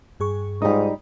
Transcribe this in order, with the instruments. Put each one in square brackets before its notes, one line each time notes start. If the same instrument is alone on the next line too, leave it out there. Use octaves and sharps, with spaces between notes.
[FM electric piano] G2 G#4 C#6
[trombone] G#2 [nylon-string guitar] G3 D#4 [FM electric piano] F4 D5 D#6